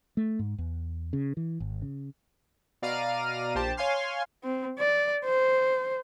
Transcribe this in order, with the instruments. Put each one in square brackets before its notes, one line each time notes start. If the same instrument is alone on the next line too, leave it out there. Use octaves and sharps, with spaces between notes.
[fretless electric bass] A3
G#2
E2
C#3
E3
G#1
C#3
[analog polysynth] B2 D5 F5 A#5 F6 D#7
A#1 G4 C5 A5
C#5 F5 G#5 C6 F6
[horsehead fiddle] C4
D5
C5